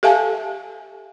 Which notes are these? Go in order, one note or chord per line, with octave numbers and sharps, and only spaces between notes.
G4 A4 E5 F5 G#5 A5